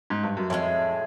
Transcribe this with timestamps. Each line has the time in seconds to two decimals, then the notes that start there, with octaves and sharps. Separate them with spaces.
0.10 G#2
0.23 G2
0.37 F#2
0.50 F2 A2 F3 G#3